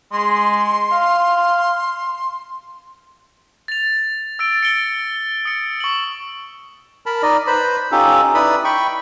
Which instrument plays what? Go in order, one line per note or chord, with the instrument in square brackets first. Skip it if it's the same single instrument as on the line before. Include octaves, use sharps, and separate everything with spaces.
[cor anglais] G#3 [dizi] C6
[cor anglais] F5
[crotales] A6 F7
E6 A6 D7
C#7 D7 G7
D#6 C#7
C#6 F#7
[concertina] A#4 A5 B5
D#4 D5 D#5
B4 C5 B5
C#4 D#4 F4 G4 A4
D#4 E4 B4 D5 B5 D#6
G5 B5 C#6